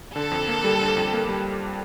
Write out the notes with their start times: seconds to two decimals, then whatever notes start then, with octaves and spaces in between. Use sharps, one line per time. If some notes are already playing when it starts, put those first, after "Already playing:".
0.16 D3 A4
0.31 F2
0.48 A#3
0.64 G3
0.81 D3
0.97 F2
1.13 A#3
1.29 G3